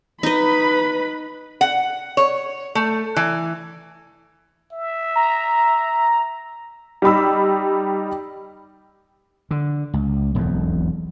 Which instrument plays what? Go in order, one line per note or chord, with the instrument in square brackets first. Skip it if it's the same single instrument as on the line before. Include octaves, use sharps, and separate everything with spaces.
[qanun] D#4 D#5 [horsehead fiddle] B4 B5
[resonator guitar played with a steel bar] F#5
C#5
A3
E3
[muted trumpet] E5
[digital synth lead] A#5
[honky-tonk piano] G3 D#4 B5 E6
[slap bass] D3
C#2
E1 B1 F2